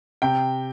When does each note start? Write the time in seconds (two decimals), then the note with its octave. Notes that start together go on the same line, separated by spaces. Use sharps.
0.22 C3 G5